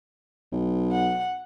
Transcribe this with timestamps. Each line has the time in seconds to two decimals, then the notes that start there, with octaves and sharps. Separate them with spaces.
0.52 B1
0.92 F#5